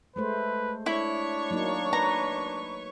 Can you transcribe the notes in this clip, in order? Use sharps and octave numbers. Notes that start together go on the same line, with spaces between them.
G#3 A3 B4 C5
D4 E4 C#5 C#6
F#3 A#3 D#4
B4 A#5